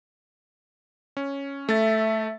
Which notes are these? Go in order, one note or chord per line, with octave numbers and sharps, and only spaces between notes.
C#4
A3 E5 A6